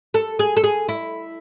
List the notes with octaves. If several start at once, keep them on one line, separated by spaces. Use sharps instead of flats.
A4
G#4
A4
G#4
E4